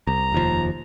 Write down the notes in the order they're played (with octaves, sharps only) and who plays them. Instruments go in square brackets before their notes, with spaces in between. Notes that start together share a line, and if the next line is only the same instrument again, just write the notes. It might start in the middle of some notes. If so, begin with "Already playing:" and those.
[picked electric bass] C2 [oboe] A#5
[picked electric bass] F1 D#2 F3